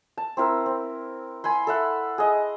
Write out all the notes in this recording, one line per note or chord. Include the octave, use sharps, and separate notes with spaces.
A5
C4 E4 A#4
C4
G#5 B5 C6
A4 E5 F#5
G#4 D#5